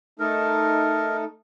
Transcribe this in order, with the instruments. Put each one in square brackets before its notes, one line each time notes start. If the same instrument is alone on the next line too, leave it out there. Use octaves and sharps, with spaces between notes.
[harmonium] A3 D#4 A4 [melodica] A#4